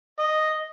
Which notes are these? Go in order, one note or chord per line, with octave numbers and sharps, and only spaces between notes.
D#5